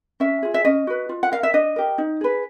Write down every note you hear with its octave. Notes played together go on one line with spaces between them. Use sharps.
C#4 E5
F4 G#4
E5
C#4 D#5
F#4 B4
F4
F#5
A#4 F5
E5
D4 D#5
G4 A#4
D#4
G#4 B4